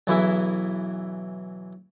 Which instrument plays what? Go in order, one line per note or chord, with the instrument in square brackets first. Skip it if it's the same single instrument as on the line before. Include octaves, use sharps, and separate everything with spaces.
[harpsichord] B1 E3 E4 G#4 E5